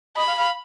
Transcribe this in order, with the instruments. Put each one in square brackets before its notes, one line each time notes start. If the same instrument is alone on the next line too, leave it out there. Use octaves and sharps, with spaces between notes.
[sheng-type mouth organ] D#5 [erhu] B5
[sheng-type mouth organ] F5
F5